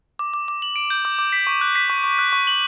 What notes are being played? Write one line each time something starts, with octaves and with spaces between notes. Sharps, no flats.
D6
D6
D6
F#7
D7
G6
D6
D6
B6
C#6
F#6
B6
C#6
C#6
F#6
C#6
F#7